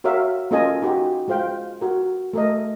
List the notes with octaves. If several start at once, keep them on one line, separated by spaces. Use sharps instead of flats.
F#4 A#4 C#5 E5 F5
A#3 C#4 F4 A4 D#5 G#5
D#4 F#4 G4
G#3 F4 C5 F5 G5
F#4 A#4
A3 A#4 D#5